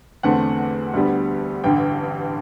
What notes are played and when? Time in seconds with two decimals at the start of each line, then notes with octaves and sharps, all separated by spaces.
0.23 E2 D3 A3 C4 F#5
0.94 D2 D3 G3 B3
1.64 A1 G2 D3 G5